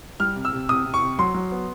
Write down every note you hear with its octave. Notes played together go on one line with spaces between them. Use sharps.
G3 F6
C3
E6
C3
C3 D#6
C3
C#6
C3
F#3 C6
F#3
B3